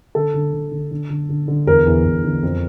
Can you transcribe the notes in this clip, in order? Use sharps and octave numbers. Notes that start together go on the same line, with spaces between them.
D3 A4
D3
D3
D3
D3
D3
D3
D3
E2 A#4
E2
E2
D3
F2